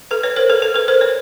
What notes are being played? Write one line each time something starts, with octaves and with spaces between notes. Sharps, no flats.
A4 B4
B4 C#5
A#4 C5
A4 B4
A4 B4
A4 B4
A#4 C5
B4 C#5